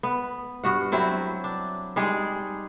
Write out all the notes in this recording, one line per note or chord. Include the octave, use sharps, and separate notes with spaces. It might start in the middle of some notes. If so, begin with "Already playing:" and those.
B3
G2 F#4 F#5
F#3 C4 E4
D4
G3 G#3 D#4 G#4